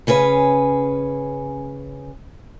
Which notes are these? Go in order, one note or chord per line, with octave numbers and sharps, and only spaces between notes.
C#3 C#4 G#4 B4